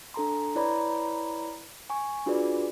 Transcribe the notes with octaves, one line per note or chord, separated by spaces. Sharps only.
D4 A4 A#5 C6
E4 B4 C#5 D5 A#5 B5
G#5 C#6
D4 F4 F#4 G#4 B4 D5